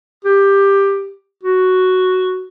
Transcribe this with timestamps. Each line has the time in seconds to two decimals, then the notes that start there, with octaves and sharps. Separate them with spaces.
0.25 G4
1.43 F#4